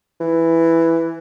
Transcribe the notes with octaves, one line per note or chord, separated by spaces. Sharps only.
E3